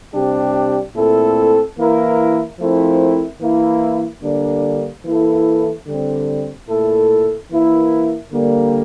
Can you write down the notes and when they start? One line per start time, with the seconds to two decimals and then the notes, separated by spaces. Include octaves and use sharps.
0.14 C3 G3 D4 G4
0.95 A#2 A3 C4 E4 A4
1.78 E3 A#3 E4 A#4
2.59 F3 A3 C4 E4 A#4
3.41 E3 A#3 E4
4.23 D3 G3 A#3 D4
5.05 E3 A#3 E4 A4
5.87 D3 G3 C4
6.68 A#2 A3 E4 A4
7.50 E3 A#3 E4 A#4
8.32 D3 G3 A#3